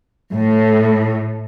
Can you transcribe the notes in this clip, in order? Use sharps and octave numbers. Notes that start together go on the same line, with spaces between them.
A2